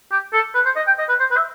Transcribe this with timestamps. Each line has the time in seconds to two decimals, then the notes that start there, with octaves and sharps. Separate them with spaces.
0.11 G4
0.33 A4
0.55 B4
0.65 C5
0.76 D#5
0.87 G5
0.99 D#5
1.09 B4
1.20 C5
1.31 B4
1.37 E5